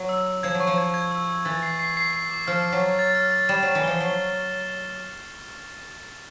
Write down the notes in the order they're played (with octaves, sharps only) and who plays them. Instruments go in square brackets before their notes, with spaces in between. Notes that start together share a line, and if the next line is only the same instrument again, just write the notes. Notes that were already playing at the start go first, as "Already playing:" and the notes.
Already playing: [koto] F#3
[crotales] E6
E6
[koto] F3 [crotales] G#6
[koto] F#3
[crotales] C#6
[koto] F3
[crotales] G#6
G#6
E6
E6
[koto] E3 [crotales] A6
[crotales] C7
C7
C7
C7
D6
[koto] F3 [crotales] F6
[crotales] F6
[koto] F#3
[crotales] A6
A6
F6
A6
[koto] G3 [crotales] E7
[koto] F#3 [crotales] E7
[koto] E3
[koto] F3 [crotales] G7
[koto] F#3 [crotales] G7